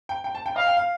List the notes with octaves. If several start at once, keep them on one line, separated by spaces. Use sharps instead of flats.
G5
G5
A5
G5
D#5 F5
G5
F5